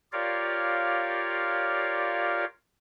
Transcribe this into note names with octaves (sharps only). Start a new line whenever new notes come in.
F4 G4 A#4 C#5 D5 F5